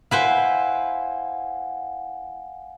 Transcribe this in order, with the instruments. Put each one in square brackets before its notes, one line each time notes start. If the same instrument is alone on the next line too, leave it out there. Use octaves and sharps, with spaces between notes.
[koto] E4 B4 C5 [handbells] F5 F#5 G#5